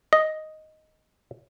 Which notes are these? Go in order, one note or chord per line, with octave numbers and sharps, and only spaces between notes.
D#5